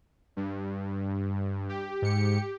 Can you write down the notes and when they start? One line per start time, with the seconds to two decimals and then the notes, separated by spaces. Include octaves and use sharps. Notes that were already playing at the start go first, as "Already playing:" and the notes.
0.36 G2
1.69 G4
2.02 G#2 C#7